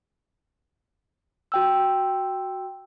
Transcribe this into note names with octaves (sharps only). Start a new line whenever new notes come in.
F#4 G5 E6